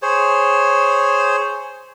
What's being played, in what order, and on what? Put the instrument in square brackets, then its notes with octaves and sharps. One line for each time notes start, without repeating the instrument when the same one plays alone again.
[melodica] G#4 C5 C#5